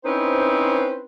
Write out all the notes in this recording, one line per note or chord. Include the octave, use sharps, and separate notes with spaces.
C4 C#4 D#4 E4 B4 C5